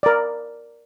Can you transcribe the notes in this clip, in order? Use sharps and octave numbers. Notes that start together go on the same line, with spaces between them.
A#4 D5